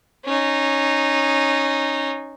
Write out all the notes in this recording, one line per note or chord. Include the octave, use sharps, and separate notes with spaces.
C#4 D#4